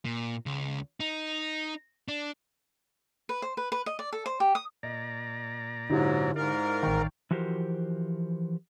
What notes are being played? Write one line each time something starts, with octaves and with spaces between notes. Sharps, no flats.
A#2
C#2
D#4
D4
B4
C5
B4
B4
D#5
D5
A4
C5
G4
D#6
A#2 D5 D#5 A#5
G#2 D3 F#3 D#4 E4 G4
G#2 A#4 D5 F5
A1 D#3 G5 A#5 C#6
E3 F3 F#4 G4 A#4 C5